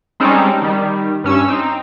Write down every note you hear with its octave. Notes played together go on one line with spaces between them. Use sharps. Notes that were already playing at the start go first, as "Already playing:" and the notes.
G3 G#3 C4 C#4 D#4 A4
D#3 G3
G2 C#4 E6
C4 D#4